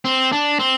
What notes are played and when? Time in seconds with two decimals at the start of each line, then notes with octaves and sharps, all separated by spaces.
0.05 C4
0.32 D4
0.59 C4